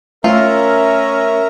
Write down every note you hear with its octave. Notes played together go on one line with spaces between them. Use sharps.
A3 C#4 F4 A#4 E5 A#5